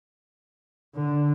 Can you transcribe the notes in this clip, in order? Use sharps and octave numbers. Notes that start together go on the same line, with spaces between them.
D3